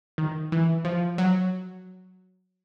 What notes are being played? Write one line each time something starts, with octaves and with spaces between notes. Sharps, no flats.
D#3
E3
F3
F#3